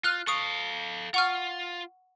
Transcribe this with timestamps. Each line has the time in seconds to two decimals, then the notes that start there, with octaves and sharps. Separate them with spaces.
0.04 F4 F6 F#6
0.27 A4 F5 C#6 D#6
1.14 F4 F#5 C#6 F6